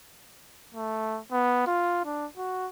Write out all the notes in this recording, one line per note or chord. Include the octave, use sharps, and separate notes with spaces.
A3
B3
F4
D4
F#4